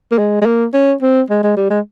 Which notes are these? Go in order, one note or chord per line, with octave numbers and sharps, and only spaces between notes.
A#3
G#3
G#3
A#3
C#4
C4
G#3
G#3
G3
G#3